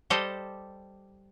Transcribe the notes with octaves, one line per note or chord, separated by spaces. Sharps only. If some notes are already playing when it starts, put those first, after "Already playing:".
G3 G4 A4 C5 D#5